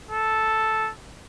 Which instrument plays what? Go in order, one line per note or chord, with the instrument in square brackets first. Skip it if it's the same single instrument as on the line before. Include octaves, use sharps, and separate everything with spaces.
[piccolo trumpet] A4